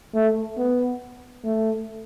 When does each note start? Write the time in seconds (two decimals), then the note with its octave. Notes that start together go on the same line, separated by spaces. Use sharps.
0.14 A3
0.58 B3
1.44 A3